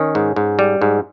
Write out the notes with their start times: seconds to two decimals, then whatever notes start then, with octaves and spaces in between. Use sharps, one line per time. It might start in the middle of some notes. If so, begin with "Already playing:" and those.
Already playing: D#3 C#4
0.15 G#2
0.36 G#2
0.59 G3
0.81 G#2